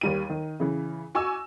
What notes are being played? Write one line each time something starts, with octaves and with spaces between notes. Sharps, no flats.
D#2 G3 D#7
D#3
C#3 E3
F#4 G#5 C#6 D6 E6